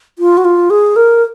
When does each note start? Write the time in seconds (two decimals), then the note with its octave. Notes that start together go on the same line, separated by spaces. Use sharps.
0.19 F4
0.37 F#4
0.45 F4
0.70 G#4
0.96 A#4